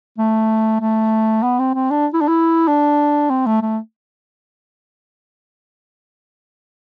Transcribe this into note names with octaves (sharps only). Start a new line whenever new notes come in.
A3
A3
B3
C4
C4
D4
E4
D4
E4
D4
C4
A3
A3